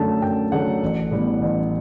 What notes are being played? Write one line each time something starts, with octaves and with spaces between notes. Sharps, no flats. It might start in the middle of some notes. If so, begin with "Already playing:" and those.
Already playing: F#2 D3 F#3 A3 A5
F#2 G5
D3 F#3 A3 F#5
A1
A2 G3 B3
A1